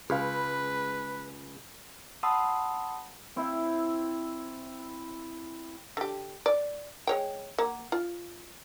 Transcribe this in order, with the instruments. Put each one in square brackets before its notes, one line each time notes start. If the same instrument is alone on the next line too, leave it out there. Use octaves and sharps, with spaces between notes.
[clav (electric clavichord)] C#2 [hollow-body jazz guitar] G#4 F5 [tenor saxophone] B4
[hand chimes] F#5 A5 B5 C6 D#6 E6
[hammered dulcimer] C4 E4
[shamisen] D3 G4
D5
G#3 C#5 G5
A#3 F#5
F4